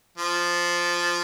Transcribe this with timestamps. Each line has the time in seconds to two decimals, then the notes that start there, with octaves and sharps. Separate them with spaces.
0.18 F3